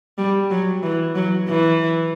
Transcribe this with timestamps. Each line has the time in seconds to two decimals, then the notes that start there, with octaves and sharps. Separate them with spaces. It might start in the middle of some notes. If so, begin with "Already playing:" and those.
0.18 G3
0.50 F#3
0.83 E3
1.15 F#3
1.48 E3